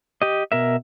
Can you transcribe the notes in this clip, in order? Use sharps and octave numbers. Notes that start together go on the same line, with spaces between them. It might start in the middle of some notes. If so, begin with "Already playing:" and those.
G4 D#5
B2 A#4 E5